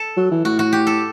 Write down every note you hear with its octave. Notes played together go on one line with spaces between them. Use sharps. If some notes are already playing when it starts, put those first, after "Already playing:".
Already playing: A4
F#3
E3
A2 F#4
F#4
G4
A4